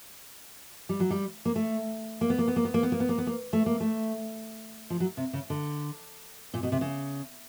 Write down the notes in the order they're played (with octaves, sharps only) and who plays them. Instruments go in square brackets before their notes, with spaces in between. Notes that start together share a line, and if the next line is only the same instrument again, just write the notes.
[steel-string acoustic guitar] G3
F#3
G3
A#3
A3
A#3
B3
A#3
B3
A#3
B3
A#3
B3
A#3
B3
A#3
B3
A#3
A3
A#3
A3
F3
F#3
C3
C#3
D3
A#2
B2
C3
C#3